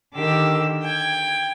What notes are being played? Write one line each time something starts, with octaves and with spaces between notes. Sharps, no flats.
D3 D#3 G4 A#4 D6 E6
G5 G#6